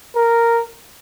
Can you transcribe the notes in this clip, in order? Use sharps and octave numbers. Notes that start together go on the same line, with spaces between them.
A#4